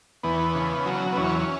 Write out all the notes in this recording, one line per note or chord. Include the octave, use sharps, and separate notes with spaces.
E2 B3
C#3
F#3
B3
E2 C#4